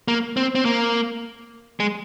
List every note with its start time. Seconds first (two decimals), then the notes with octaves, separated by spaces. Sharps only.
0.08 A#3
0.37 C4
0.55 C4
0.65 A#3
1.80 G#3